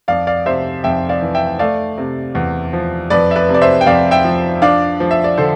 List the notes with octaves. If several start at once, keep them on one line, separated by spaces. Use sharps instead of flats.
F2 D5 F5
D5 F5
C3 C5 E5
F2 E5 G5
D5 F5
E3
E5 G5
A3 D5 F5
C3
E2
F3
F2 B4 D5
E5
B4 D5
C3
D5
C5 E5
G5
F2 D5 F5
E5 G5
F3
D4 D5 F5
F3
E5
D5
D3 A4 C5